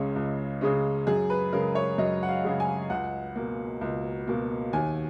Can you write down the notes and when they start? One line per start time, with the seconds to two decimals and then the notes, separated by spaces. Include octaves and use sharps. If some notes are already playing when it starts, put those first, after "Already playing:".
Already playing: C#2 C#3 G#3 C#4
0.16 C#2
0.61 C#3 G#3 C#4
1.07 F#2 G#4
1.30 B4
1.53 C#3 G#3 A#4
1.75 C#5
1.98 F#2 D#5
2.23 F#5
2.29 F5
2.44 C#3 G#3
2.60 G#5
2.90 C#2 F#5
3.36 B2 A#3
3.81 C#2
4.27 B2 A#3
4.73 D#2 G#5